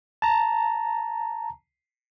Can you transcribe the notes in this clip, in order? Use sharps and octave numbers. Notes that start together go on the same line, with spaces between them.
A5 A#5